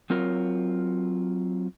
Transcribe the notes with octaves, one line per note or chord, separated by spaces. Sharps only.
F#3 C4 F4 A#4 C#5